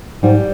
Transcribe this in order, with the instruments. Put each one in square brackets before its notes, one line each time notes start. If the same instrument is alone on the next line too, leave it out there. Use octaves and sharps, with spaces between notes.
[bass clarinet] G#2 [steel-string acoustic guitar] G3